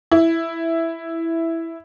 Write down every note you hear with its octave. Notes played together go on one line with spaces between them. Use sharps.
E4